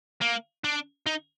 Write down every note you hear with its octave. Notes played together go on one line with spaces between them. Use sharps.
A#3
D4
D#4